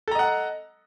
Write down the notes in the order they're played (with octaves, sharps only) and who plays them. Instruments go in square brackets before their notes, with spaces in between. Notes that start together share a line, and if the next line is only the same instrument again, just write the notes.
[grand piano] A4
A#5
D#5
F#5